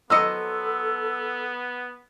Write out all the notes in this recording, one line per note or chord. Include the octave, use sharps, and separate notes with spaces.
F#3 B3 A4 C5 D#5 E6 C#7